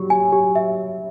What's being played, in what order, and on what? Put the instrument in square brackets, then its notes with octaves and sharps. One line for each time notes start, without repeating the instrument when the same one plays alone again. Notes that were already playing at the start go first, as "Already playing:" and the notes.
Already playing: [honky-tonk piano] F#3 G3 [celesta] G4
[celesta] G#5
G4
E5